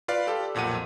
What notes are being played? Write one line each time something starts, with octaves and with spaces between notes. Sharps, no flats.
F4 B4 D5 F5
G4 A4
B1 F2 A#2 F#5 D#7